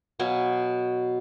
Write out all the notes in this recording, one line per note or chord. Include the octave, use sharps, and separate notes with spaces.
B2 F#3 F5 G#5